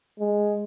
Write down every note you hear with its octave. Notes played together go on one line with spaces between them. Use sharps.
G#3